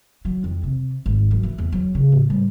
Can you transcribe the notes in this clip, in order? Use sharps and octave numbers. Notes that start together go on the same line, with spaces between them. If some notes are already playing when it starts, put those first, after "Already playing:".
F#3
F2
C3
G#1
F#2
E3
E2
F#3
C#3
A2
G3